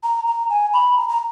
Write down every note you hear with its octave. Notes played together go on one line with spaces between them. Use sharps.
A#5
A#5
G#5
B5
A#5
A#5